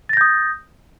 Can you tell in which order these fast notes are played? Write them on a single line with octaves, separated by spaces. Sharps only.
A6 A#6 G6 D#6